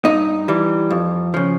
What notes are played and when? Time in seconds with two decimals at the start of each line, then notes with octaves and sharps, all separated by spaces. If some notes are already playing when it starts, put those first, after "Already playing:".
0.05 G2 D#4
0.48 E3 G3
0.90 F2
1.34 C#3 F3